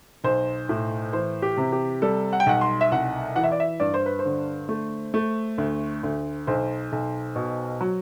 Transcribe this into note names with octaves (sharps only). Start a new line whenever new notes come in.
B1 C5
A2
E3 C5
G4
C3
G4
G3 A4
F#5
G5
B1 F#5
C6
E5
C2 F#5
E3 F#5
E5
D5
E5
G2 D5
C5
B4
C5
D3
A3
A3
D2
D2
B1 C5
B1
B2
F#3